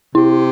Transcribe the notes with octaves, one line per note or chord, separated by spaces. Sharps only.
C3 E4